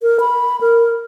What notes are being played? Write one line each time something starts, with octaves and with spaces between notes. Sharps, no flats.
A#4
B5
A#4